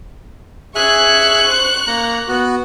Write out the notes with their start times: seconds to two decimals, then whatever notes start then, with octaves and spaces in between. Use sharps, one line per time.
0.75 G#4 E5 G#5 C#6 F#6
1.48 C5
1.87 A#3 A#5
2.28 B3 F#4